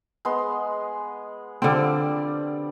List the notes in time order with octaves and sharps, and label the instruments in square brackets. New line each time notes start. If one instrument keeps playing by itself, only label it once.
[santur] G#3 B3 C6
[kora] D3 C4 [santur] F3 G3 D5